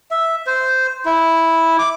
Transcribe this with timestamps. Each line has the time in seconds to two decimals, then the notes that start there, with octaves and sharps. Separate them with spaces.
0.11 E5
0.47 C5
1.05 E4
1.79 D6